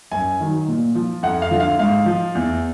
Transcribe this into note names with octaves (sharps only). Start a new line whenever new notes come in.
F#2 G#5
D#3 F#3
A#2
F3
F2 F#5
F5
D3 F3
F5
G#2 F5
F3
E2